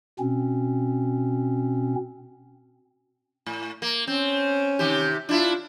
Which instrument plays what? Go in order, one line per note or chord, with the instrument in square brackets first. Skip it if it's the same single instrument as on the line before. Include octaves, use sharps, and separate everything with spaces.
[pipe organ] B2 C4 C#4
[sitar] A2
A#3
[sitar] C4 [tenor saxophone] C#4
[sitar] C3 D#3 G4
[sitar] D4 E4 [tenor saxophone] F4